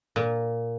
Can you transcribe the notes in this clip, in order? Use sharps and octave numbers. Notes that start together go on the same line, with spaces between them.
A#2